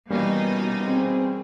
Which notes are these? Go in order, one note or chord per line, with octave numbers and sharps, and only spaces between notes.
B2 E3 G3 A#3 C#4 D#4
C4 G#4